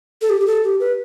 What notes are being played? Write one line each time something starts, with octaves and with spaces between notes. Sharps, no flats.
A4
G4
G4
A4
G4
B4